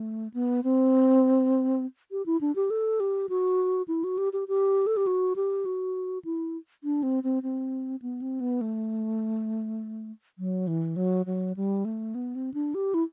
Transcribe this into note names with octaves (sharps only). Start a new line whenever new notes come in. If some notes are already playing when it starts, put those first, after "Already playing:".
Already playing: A3
B3
C4
G4
E4
D4
G4
A4
G4
F#4
E4
F#4
G4
G4
G4
A4
G4
F#4
G4
F#4
E4
D4
C4
C4
C4
B3
C4
B3
A3
F#3
E3
F#3
F#3
G3
A3
B3
C4
D4
G4
E4